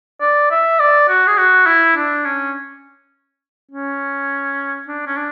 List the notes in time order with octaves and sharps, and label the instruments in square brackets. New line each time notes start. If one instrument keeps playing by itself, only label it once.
[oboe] D5
E5
D5
F#4
G#4
F#4
E4
D4
C#4
C#4
D4
C#4
D4